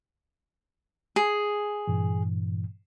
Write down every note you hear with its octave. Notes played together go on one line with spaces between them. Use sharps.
G#4
G2 A#2 E3